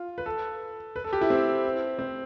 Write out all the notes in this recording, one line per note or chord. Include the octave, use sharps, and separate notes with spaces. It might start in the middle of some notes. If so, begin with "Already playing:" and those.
Already playing: F4
B4
A4
B4
A4
G4
E4
C4
C4